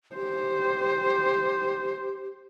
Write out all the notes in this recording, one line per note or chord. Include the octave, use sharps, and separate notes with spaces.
G4 C5